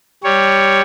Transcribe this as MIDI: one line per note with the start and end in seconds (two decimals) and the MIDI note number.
0.24 0.81 55
0.24 0.81 73